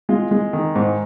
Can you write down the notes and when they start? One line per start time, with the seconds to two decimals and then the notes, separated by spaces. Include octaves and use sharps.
0.09 G#3 F4
0.31 G#3
0.53 D#3
0.75 G#2